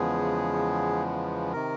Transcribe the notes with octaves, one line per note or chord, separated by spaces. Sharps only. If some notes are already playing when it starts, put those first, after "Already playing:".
Already playing: E2 C#3 F3 G#3 B3 G#4
C3 D#3 A#4